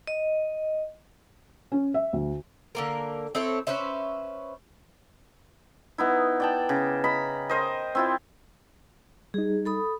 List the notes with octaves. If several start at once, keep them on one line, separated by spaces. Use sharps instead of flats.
D#5
C#4
E5
D2
D3 A#3 A#4
C4 E4 A4 C#5
C#4 B4 C5 E5
B3 D#4 E4
D5 G5 A5
C#3
D#5 A#5 B5
A#4 C5 D#5
C4 E4 F4
G3 D#4 G#4
A4 B5 D#6